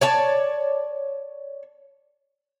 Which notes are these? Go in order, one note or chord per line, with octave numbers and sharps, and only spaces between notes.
C#5 D5 A5